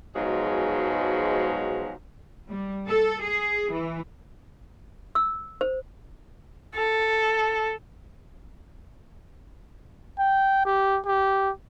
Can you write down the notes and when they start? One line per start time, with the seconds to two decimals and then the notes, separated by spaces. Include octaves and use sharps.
0.15 G#2 B2 F3 F#3 G#3
2.51 G3
2.87 A4
3.20 G#4
3.72 E3
5.15 E6
5.61 C5
6.75 A4
10.19 G5
10.65 G4
11.06 G4